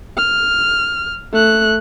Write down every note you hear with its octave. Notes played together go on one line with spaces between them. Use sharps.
F6
A3 F#6